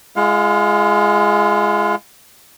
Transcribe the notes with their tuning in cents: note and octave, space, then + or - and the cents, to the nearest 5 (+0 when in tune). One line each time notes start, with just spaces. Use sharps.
G#3 +0 F4 -40 F5 +35